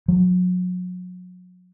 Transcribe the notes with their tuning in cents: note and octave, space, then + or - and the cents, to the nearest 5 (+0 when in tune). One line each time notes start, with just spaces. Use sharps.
F#3 -35